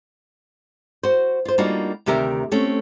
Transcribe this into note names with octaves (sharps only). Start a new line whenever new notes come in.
F#4 C5
F4 C5
G3 A#3 D4 D#4 F4 F#4
D2 C3 D#3 G4 A#4 E5
A3 C4 C#4